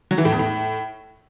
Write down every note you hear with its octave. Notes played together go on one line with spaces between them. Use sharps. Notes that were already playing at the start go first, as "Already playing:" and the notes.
F#3
E3
A2
E2
A2